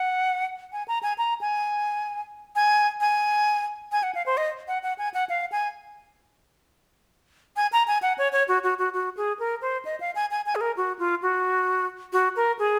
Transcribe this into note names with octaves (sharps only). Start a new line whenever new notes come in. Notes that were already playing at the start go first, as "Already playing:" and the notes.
Already playing: F#5
G#5
A#5
G#5
A#5
G#5
G#5
G#5
G#5
F#5
F5
C5
D#5
F#5
F#5
G#5
F#5
F5
G#5
G#5
A#5
G#5
F#5
C#5
C#5
F#4
F#4
F#4
F#4
G#4
A#4
C5
D#5
F5
G#5
G#5
G#5
G#4
A#4
F#4
F4
F#4
F#4
A#4
G#4